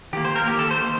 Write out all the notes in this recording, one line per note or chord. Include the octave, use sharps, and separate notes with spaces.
D#3 A#3 G4
C5
A#4
D#3 A#3 G4
A4
C5
D#3